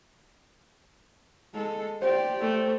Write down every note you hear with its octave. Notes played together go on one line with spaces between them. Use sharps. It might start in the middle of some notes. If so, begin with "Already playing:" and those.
G#3 A4
G4 C5 D5
A3